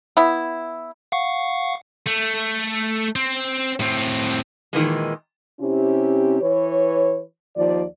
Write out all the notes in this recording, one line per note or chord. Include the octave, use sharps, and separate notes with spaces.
B3 E4
F5 F#5 C#6
A3
C4
A2 C4
A#2 D#3 E3 G#3
C3 C4 C#4 E4 G4
E3 B4 C#5
D#2 F3 D5